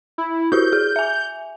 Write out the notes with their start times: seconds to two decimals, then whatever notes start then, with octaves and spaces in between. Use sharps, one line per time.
0.18 E4
0.52 E4 F#4 G4 G6
0.73 G#4
0.96 E5 G#5